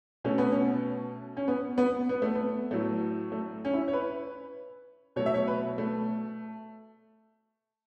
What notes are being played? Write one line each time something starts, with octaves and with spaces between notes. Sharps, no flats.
B2 A3 C#4
B3
C#4
C#4
B3
B3
B3
A3
B3
A2 F#3 A3
A3
C#4
E4
C#5
B4
B2 F#3 A3 C#5
E5
C#5
B4
A3